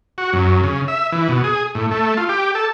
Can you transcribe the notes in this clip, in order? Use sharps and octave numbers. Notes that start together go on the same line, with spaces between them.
F#4
F#2
C#3
E5
E3
B2
G#4
A2
A3
F4
G4
A4